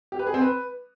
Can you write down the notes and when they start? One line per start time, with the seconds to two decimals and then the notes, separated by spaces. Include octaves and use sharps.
0.12 G4
0.19 B4
0.27 G#4
0.34 C4
0.41 B4